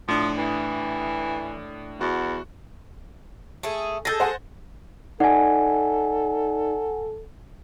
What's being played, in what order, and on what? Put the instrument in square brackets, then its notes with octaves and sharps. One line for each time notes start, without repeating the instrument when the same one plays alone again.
[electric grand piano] A2 D4 D#6 [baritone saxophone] F3
[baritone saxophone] E3
[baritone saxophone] E2 [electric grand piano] F#4
[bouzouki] A3 G#4
[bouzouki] G#4 A4 [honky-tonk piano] G6 A6 A#6
[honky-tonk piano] C5 F#5 G#5
[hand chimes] D#4 D5 [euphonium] A4 [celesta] F#5 G#5